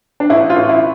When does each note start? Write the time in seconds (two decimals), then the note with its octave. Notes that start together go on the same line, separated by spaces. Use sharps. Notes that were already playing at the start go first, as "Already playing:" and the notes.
0.20 D4
0.30 A1 E4
0.50 F4
0.56 A1
0.69 E4